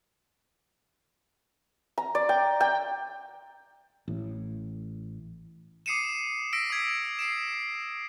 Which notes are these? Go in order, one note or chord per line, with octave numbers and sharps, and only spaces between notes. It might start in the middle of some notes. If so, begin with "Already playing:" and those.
A#5
D5
G5
G5
A1 A2
D6 D#6 C7 C#7 D#7 E7
E6 A#6 B6 D7
D#6 G#6 B6
C7 D7 E7